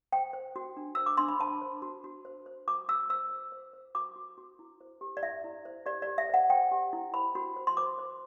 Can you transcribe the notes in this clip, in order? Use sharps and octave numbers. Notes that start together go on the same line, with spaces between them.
C5 G5
C5
F#4
D4
C5 E6
D6
D4 C6
B5
C5 A5
C5
F#4
F#4
C5
C5
F#4 D6
F#4 E6
C5 E6
C5
C5
C5
F#4 D6
F#4
F#4
E4
C5
G4
D5
E4 E5
E4
C5
G4 D5
G4 D5
E5
C5 F#5
C5 G5
G4
E4
C5 B5
F#4
C5
C6
C5 D6
C5